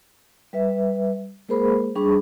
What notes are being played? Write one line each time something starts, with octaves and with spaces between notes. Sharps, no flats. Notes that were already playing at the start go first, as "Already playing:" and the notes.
G3 B4 E5
G#3 A#3 G#4 A#4 C5 B5
G3 D4 G#4 B5 C#6